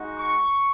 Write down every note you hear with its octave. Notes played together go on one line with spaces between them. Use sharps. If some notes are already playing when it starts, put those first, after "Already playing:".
Already playing: G#3 D#4 F#4
C#6